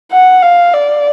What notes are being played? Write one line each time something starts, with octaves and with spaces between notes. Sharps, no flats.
F#5
F5
D5